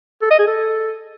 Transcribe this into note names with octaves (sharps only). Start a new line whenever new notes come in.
A4
D#5
G#4
A4